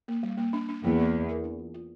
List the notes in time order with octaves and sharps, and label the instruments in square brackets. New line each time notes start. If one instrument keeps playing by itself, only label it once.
[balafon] A#3
G3
A#3
D4
D4
[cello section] E2 [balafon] A#3
[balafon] A#3
A#3
A#4
D4
F4
F4